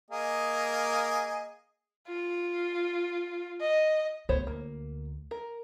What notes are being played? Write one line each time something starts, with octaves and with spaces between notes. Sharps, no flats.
A#3 G#4 D#5
F4
D#5
D2 B3 C5 C#5
A#3
A#4